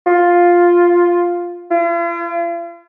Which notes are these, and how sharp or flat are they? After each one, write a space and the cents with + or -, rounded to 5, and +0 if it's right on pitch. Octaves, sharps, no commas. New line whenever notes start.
F4 +5
F4 -45